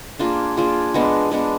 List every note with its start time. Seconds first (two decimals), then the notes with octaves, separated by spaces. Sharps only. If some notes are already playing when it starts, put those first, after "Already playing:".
0.19 A#3 D4 F4 G#4
0.57 A#3 D4 F4 G#4
0.94 G#3 B3 D4
1.32 G#3 B3 D4